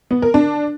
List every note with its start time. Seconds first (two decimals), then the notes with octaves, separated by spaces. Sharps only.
0.11 B3
0.22 A#4
0.34 D4